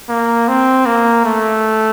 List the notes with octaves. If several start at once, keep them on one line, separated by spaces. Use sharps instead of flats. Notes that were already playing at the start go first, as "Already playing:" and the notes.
A#3
C4
A#3
A3